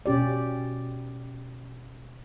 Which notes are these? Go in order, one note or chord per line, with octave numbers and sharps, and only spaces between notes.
B2 C#4 G4 D5